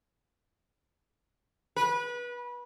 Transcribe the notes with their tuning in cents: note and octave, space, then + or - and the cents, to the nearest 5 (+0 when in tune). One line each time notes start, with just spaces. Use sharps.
B4 -25